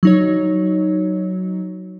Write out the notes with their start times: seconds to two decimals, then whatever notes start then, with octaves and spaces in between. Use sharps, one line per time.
0.03 F#3 D#4 C#5